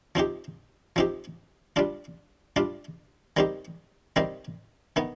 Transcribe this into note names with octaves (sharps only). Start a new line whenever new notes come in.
F3 C4 D#4 G4
F3 C4 D#4 G4
G3 D4 F4
G3 D4 F4
D#3 G3 C4 D#4 G4
D#3 G3 C4 D#4 G4
D#3 B3 D#4